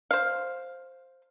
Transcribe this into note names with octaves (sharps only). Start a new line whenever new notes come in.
C5 F5